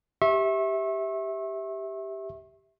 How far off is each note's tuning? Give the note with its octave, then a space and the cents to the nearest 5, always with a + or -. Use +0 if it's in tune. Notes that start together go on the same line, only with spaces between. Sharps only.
G4 +0 E5 -15 C#6 -40